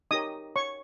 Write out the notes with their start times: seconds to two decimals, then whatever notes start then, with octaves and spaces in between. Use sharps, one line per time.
0.11 D#4 G4 A#4 C#5 D#5 D#6
0.56 C#5 C#6